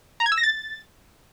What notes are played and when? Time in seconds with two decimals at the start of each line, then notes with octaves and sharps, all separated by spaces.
0.20 A#5
0.26 G#6
0.32 E6
0.38 A#6
0.43 A6